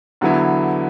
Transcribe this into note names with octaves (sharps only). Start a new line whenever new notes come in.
E2 D3 F#3 B3 E4